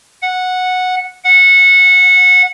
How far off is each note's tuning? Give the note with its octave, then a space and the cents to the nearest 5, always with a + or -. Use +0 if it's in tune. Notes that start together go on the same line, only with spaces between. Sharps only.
F#5 -10
F#5 -20